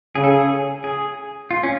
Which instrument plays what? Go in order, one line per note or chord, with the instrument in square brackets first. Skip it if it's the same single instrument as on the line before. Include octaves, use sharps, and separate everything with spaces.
[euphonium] C#3 [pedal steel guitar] G#4
[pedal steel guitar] A4
G#4
G#4
F4
C#4